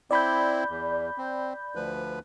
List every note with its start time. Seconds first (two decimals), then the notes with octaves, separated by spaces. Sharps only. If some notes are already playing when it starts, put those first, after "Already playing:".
0.11 C4 E4 D5 B5 G6
0.69 E2
1.18 C4
1.75 D2 F3 B4